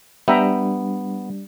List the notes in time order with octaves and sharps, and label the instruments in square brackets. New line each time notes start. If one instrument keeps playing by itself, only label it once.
[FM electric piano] G3 D4 [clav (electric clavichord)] B3 [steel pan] E5 G5 A#5